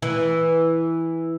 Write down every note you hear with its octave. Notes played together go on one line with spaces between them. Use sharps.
E3